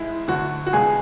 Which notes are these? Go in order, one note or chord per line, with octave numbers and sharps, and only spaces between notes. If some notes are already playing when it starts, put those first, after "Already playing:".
Already playing: G#2 G#3 E4
D2 D3 F#3 A3 F#4
F#4
C#2 B2 G#3 G#4